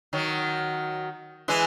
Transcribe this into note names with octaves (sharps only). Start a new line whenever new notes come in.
D#3 F#3
E3 G#3